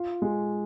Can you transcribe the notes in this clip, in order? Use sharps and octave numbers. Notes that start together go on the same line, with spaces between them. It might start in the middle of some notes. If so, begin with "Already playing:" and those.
Already playing: F4
G#3